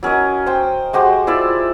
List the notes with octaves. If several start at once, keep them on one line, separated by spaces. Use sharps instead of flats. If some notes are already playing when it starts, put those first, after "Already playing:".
F#3 C#4 A#4 D#5
C5 G5
G#3 F#4 G4 C5
E4 F4 D5 E5